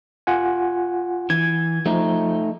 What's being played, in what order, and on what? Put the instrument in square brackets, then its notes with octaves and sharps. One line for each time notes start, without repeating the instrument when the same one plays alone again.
[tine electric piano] F4 F#5 G#5
[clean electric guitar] E3 [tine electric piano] G#6
[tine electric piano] F3 [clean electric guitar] A3 D#4